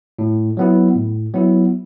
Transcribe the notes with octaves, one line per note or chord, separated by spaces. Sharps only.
A2
F#3 B3 E4
A2
F#3 B3 E4